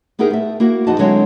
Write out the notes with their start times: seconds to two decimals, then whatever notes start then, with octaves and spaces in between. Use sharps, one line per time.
0.19 B3 D#4 E4 G4 G#4 A#4
0.30 A3 E5
0.60 A#3 E4 F#4 A#4
0.87 E2 F3 D#4 F#4 D#5 A5
0.98 D3 F#3 G#3 C4 E4 C#5